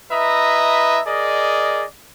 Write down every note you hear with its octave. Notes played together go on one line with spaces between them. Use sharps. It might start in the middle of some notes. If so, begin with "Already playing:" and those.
E4 B4 D#5 E5 A#5
G#4 A#4 D5 D#5